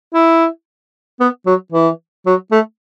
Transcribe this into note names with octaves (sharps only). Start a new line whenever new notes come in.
E4
B3
F#3
E3
F#3
A3